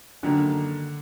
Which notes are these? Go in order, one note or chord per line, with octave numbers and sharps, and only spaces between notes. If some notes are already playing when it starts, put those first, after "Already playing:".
F#1 F#2 D3 D#3 F#3 A#3